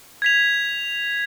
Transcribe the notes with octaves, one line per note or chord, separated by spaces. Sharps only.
G#6 B6 F7